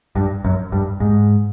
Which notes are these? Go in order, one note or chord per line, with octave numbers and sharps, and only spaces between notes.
G2
F#2
G2
G#2